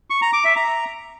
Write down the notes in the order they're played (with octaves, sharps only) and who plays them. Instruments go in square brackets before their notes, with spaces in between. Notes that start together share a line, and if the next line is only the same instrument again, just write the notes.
[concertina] C#6
A#5
D6
E5
A#5